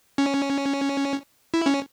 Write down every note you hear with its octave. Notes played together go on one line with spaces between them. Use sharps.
C#4
E4
C#4